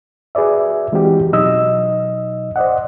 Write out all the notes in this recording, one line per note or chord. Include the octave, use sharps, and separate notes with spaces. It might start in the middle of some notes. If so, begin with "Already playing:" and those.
F#4 G#4 B4 D5 E5
E3 G#3 C4 E4 F#4 G4
B2 F#3 D#4 D#5 E6
C5 D5 D#5 F#5